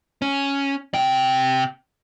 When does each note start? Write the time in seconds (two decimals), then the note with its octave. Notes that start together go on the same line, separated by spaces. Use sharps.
0.22 C#4
0.94 C3 G5